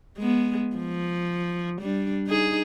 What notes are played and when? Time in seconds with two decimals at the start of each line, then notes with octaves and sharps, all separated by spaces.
0.19 G#3 B3
0.76 F3
1.81 G3 D4
2.27 D#4 G#4